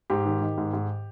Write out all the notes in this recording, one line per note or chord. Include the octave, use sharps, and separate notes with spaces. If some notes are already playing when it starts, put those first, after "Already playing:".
G#2 G4
D#3
D#3
G#2
G#2